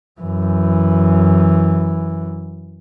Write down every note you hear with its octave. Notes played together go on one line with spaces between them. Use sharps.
F#2 E3